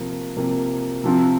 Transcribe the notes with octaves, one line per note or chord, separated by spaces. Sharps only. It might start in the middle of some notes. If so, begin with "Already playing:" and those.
Already playing: C3 F3 A#3
C3 F3 A#3
C3 F3 C4